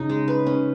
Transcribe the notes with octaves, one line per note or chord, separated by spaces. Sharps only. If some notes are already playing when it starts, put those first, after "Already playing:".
Already playing: C#3 D#4
G#3
B4
C#4